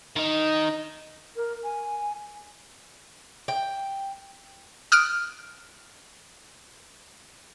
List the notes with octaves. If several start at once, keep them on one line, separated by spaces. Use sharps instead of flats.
D#3 D#4
A#4
G#5
G5
D#6 F6 F#6 D7